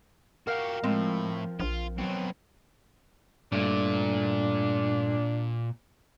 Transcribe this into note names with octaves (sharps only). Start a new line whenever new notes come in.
F#4 G4 A#4 F5
A2 F3 G#3 C4
A#1 F4
B2 F#3 C4
G2 A#2 A3 D4